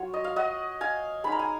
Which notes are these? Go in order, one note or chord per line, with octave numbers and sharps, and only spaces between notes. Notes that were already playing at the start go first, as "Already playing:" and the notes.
Already playing: F#3 F4 C#5
D#5
F5
D#5 F#5
F5 G#5
G#3 D#4 B5
A#5
G#5